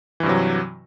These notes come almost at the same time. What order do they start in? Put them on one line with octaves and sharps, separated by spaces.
E3 G2 C3 F#3